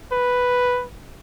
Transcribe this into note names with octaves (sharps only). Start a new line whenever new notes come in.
B4